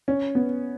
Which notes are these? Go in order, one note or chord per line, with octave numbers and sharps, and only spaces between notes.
C#4
B3